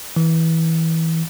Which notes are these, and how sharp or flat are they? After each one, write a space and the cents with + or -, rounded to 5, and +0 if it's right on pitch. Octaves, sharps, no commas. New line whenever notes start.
E3 -20